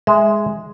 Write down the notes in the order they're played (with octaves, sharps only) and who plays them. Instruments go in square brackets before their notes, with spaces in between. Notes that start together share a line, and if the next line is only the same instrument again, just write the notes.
[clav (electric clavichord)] G#3 [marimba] E5